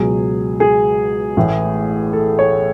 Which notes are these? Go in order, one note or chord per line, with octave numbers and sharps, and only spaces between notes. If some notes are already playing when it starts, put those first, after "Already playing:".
Already playing: C#2 B2 F#3 G#4
G#4
A1 A2 E3
A4
C#5